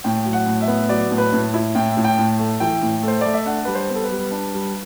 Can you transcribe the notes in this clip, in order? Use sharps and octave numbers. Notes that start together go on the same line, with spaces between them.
A2 G5
F#3
F#5
A2
E5
B3
F#3 D5
A2
B4
A2
E4
A2 G5
A2
G5
A2
A3
E3 G5
A2
A3 C5
A3 D5
E5
D4 F#5
G3 B4
C5
B3
A4
B4
G3
D4
G3